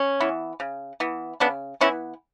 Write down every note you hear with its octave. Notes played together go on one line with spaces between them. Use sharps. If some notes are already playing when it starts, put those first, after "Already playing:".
Already playing: C#4
E3 B3
C#3
E3 B3
C#3 B3 D4
E3 B3 C#4 E4